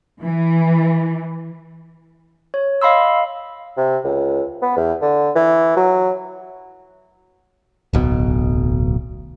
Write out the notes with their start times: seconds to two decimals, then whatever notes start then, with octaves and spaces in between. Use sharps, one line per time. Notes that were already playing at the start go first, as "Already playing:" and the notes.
0.20 E3
2.54 C#5
2.82 D#5 F5 B5 C6 E6
3.77 C3
4.04 C#2
4.62 B3
4.76 E2
5.01 D3
5.35 E3
5.76 F#3
7.93 D1 B1 B2